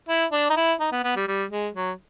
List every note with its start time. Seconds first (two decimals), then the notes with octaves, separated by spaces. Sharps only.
0.08 E4
0.32 D4
0.50 D#4
0.56 E4
0.80 D#4
0.92 B3
1.04 B3
1.16 G3
1.27 G3
1.51 G#3
1.75 F#3